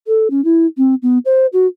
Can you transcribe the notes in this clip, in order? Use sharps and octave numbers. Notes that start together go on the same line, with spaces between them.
A4
C#4
E4
C4
B3
C5
F#4